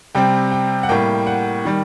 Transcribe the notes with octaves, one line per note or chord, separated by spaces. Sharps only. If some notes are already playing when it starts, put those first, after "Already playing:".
C3 G3 C4 G5
G5
F#5
A2 G3 A#3 G5
F#5
D#3 G3